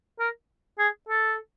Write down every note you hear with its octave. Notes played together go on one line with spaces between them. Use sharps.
A#4
G#4
A4